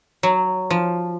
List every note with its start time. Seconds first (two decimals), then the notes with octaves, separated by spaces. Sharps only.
0.23 F#3
0.70 F3